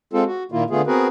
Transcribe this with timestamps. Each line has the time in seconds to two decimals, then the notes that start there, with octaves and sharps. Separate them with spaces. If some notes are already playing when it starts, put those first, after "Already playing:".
0.13 G#3 C4 F4 A4
0.26 F#4
0.52 A#2 D#3 A#3 E4 F4
0.70 D3 A3 B3 F4 G#4
0.87 B3 C4 F#4 G#4 A#4 B4